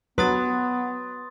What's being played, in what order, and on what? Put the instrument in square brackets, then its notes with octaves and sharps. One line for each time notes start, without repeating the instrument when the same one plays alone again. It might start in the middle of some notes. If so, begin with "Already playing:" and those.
[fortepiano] F#3 [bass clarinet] B3 [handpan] B4 [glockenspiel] C6 D#6 A6